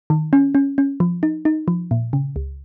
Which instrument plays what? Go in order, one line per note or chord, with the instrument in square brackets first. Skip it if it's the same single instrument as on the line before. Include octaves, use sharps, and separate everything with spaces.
[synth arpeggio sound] D#3
C#4
C#4
C#4
F3
D#4
D#4
F3
A#2
C#3
C#2